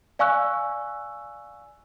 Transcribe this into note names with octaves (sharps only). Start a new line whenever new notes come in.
D5 F5 G#5 C#6 E6 F#6